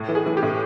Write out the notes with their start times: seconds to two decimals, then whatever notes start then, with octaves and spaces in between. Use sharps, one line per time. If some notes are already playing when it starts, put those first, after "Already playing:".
Already playing: A2
0.09 E3
0.15 G#4
0.26 E3
0.37 G4
0.43 A2